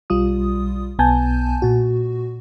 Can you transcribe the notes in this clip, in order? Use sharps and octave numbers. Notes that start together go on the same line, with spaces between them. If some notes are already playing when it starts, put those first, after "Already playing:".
B1 G3 F4 D#6
B1 B3 G#5 A5 G6
A#2 F#4